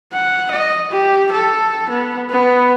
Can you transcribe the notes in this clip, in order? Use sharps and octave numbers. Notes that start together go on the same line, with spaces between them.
F#5
D#5
G4
A4
B3
B3